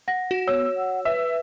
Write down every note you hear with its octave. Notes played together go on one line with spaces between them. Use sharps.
F#5 A#6
F#4
B3 C#5 E6
F#5
B4 E5